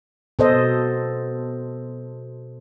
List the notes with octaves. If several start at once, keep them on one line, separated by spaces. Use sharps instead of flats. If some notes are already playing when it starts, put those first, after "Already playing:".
B2 A4 C5 D#5